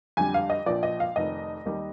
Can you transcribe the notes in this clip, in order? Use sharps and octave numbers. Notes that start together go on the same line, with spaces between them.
F2 D3 G3 G#5
F5
D#5
A#1 A#2 F3 D5
D#5
F5
F1 F2 D#3 D#5
D#2 D#3 G3